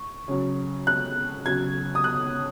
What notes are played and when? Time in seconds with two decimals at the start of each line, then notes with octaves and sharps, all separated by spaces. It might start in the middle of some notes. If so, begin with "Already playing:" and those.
Already playing: C#6
0.28 C#3 F#3
0.87 F#6
1.46 C#3 F#3 G#6
1.95 D#6
2.04 F#6